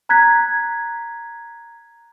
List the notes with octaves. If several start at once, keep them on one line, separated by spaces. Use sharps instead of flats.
A#5 F#6 G#6 B6